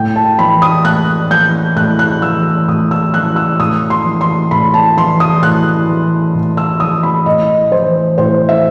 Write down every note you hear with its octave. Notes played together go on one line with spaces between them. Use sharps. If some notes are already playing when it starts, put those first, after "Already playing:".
Already playing: A2 G5
A5
E3 B5
D#6
A2 F#6
E3 G6
A2 F#6
F#6
E3 E6
A2 D#6
E6
E3 F#6
E6
A2 D#6
C6
E3
C6
A2 B5
A5
E3 C6
D#6
A2 F#6
E3
A2
E6
E3 D#6
B5
A2 D#5
E3 C5
A2 C5
E5